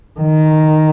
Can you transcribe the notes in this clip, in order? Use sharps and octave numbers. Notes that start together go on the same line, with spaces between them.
D#3